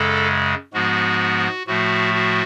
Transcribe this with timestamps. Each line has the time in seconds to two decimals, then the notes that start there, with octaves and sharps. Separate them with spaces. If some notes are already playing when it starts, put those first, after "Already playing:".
Already playing: F#2 C#3 G#3 A4
0.73 G#2 F3 G#3 B3 F#4
1.67 A2 F3 A3 F#4
2.14 F#4